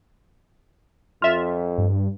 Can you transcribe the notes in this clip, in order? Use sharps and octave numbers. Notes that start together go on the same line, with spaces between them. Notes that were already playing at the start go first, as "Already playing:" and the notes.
F2 F4 E5
G2